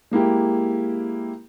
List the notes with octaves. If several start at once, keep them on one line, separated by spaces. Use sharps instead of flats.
G#3 A#3 E4 G4